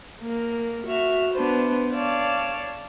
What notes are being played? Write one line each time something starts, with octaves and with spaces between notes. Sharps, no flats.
A#3 A#4
F#4 E5 F6
B3 D4 B4 C5
C#5 D5 F5 A5